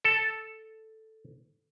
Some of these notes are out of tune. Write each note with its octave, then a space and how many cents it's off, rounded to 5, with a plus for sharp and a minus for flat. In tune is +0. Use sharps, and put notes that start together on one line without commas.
A4 +0 A5 -5